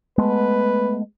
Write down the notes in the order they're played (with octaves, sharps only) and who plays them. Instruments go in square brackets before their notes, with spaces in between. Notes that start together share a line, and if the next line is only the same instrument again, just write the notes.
[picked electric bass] G#3 A3 B3 [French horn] B4